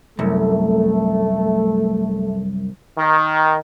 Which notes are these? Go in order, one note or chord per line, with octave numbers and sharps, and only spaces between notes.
C2 F#2 A3
D#3